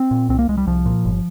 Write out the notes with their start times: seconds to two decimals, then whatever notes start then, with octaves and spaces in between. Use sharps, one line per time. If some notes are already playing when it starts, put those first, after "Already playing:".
Already playing: C4
0.11 A#2
0.29 C2 C4
0.39 A#3
0.48 C2 G#3
0.58 G3
0.67 C2 F3
0.86 A#2
1.05 G1